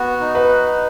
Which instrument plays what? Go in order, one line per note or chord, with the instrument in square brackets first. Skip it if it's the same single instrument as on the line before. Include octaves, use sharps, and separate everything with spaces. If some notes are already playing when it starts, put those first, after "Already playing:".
Already playing: [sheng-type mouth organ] B3 F#4
D#4
[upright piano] B4